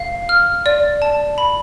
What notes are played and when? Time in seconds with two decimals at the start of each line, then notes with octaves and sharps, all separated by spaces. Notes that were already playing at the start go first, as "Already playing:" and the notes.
Already playing: F5
0.29 F6
0.66 D5
1.02 A5
1.38 B5